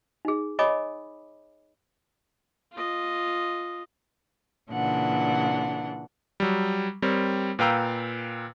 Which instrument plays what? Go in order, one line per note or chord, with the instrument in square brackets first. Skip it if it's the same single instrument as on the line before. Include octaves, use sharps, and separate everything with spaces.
[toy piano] D#4 G#4
C#5 D#5 G#5 B5 D6 D#6
[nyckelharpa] F4 D#5
[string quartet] A#2 C#3 E3 D4 F#5
[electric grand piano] F#3 G3
G3 C4 A#4 C#5
A#2 B4 F5 G5 A#5 E6